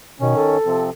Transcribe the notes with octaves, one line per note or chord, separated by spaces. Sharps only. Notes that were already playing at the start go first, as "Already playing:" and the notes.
B2 D#3 C#4
A4
C3 F3 C4